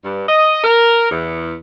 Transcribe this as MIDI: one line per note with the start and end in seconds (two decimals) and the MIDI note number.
0.05 0.23 43
0.28 0.62 75
0.64 1.11 70
1.11 1.56 40